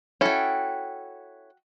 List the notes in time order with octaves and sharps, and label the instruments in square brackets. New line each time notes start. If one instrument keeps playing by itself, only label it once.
[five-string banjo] C#4 E4 A4 [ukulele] F#4 G5